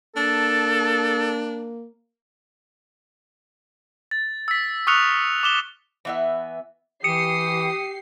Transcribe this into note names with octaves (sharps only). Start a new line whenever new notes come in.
A#3 D4 A4
A6
E6 B6
C#6 D#6 F6 F#6 C#7 F7
D6 E7 G7
E3 B3 E5
E3 G4 D#6 C7 C#7